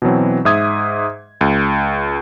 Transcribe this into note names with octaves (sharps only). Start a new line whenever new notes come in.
B2 E3 F#3 C4
G#2 E5 D#6 G#6
C#2